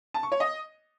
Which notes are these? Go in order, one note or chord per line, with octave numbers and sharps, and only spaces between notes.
A5
C#6
C#5
D#5